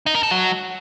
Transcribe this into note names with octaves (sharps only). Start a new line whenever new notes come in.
D#4
A#4
A4
F#3